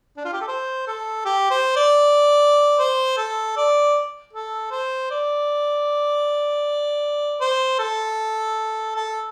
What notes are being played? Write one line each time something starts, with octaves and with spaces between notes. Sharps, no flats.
D4
F4
G4
A4
C5
A4
G4
C5
D5
C5
A4
D5
A4
C5
D5
C5
A4
A4